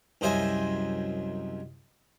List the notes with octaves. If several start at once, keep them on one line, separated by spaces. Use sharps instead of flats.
C2 F#2 C5 D#5 E5 G#5